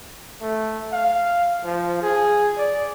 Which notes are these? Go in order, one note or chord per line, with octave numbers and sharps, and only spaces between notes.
A3
F5
F3
G#4
D5